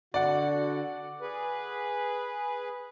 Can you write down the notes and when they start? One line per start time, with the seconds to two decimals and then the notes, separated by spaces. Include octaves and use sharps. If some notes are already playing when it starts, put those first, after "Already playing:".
0.14 D3 F#4 D5 F#5
1.21 G#4 B4